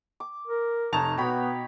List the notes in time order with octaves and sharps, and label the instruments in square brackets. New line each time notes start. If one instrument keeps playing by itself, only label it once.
[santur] D6
[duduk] A#4
[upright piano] F1 A5 F7 [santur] D#4 C#5 A#5
[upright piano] B2 [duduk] B3 [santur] C#5 G5 B5